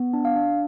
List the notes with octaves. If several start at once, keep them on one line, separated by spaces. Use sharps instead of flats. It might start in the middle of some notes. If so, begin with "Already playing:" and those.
Already playing: B3
D4
F5
D4